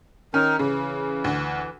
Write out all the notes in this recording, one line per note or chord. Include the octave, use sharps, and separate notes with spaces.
D#3 C#4 D#4 A#4
C#3 E3
D2